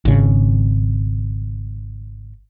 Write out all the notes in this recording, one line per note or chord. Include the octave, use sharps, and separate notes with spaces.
G#1 C#3